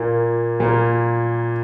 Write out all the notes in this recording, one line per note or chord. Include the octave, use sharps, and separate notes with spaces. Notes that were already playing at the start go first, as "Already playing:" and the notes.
Already playing: A#2 A#3
A#2 A#3